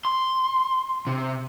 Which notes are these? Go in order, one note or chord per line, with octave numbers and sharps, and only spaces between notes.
C6
C3